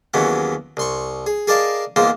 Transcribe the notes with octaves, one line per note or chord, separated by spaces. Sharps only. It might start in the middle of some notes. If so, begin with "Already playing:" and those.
D#2 E3 F#3 G#3 B3 C#4
C2 C6 C#6
G#4
G#4 A#4 D5 D#5 F5 A5
E2 G#2 A#3 F4 C5